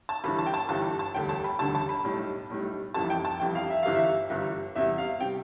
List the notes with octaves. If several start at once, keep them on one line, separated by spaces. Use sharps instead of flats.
A5
G1 G2 E3 G3 B5
A5
G5
A5
G1 G2 E3 G3 A5
A5
E1 D2 D3 G3 G5
A5
B5
E1 D2 D3 G3 A5
A5
B5
B1 A2 G3
B1 A2 G3
F1 F2 E3 G3 A5
G5
A5
F1 F2 E3 G3 G5
F5
E5
G1 G2 E3 G3 F5
E5
G1 G2 E3 G3
E2 C3 G3 E5
F5
C3 G3 G5